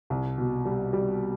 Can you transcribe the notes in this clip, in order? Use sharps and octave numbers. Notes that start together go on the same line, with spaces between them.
C2
B2
G3
G3